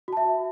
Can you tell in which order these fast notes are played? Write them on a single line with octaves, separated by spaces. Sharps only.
F#4 A5 E5